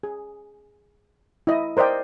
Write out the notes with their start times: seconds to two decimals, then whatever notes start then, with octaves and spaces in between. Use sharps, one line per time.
0.03 G#4
1.47 E4 D#5
1.77 A#4 C5 D5 D#5 G5